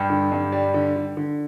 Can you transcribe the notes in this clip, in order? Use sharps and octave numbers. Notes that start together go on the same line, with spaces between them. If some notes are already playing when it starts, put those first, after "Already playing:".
Already playing: G2 G4
D3
G2
G3
D3
D3
D3